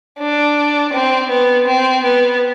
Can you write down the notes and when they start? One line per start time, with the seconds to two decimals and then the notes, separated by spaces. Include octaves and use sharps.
0.19 D4
0.93 C4
1.29 B3
1.67 C4
2.04 B3